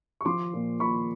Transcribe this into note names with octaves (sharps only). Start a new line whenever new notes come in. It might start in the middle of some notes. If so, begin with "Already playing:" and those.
C#6
F3 C6 D6
A#2
A#2 B5 C#6